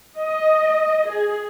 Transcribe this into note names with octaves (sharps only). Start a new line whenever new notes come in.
D#5
G#4